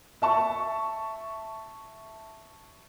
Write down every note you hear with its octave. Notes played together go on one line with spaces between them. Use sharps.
E5 A5 C#6